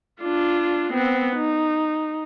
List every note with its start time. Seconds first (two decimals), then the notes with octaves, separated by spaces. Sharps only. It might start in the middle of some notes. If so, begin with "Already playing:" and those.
0.22 D4 F4
0.93 B3 C4
1.36 D#4